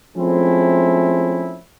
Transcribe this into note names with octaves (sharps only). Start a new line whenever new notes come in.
F3 G#3 A3 C4 C#4 E4